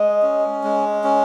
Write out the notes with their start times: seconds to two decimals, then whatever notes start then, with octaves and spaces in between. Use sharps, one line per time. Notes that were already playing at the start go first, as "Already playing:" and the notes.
Already playing: G#3 D#5
0.23 C#4
0.64 G#3
1.04 C#4